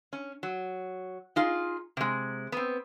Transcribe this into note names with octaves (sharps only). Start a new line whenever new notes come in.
C#4
F#3
D#4 F4 G#4
C3 G#3
B3 C4